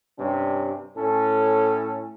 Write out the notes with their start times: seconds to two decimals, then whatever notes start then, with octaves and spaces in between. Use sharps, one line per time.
0.19 G2 C3 C#4
0.96 A2 C#4 A4